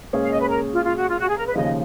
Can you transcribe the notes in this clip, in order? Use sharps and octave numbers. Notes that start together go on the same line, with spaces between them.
A#2 G#3 C#4 G#4 C#5
F5
D#5
B4
A#4
F4
F4
F#4
F4
F#4
G#4
A#4
B4
D#2 C#3 F3 D#5